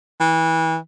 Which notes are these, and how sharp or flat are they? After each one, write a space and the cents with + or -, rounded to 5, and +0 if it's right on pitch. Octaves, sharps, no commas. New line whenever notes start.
E3 -25